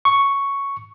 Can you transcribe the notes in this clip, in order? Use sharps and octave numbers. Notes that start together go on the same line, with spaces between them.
C#6